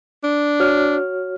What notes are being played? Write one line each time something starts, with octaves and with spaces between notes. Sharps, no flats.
D4
F#4 C#5 F6